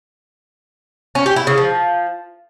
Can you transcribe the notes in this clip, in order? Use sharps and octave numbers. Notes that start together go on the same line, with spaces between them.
C#4
G4
E4
C#3
F3